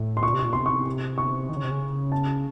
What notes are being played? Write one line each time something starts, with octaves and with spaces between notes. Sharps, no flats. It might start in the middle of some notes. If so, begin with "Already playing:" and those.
Already playing: A2
C6
A#2 C#6
C3
C#6
A#2
C3 C6
C#6
C#6
D#3
C#3
C3
C#3
A5